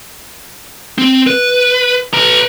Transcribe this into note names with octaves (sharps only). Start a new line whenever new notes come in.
C4
B4
B4 A#5